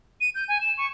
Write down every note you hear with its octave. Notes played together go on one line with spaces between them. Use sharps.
D#7
G6
G#5
E7
C#6